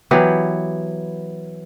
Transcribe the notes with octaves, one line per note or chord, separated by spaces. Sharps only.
E3 F#3 B3 G4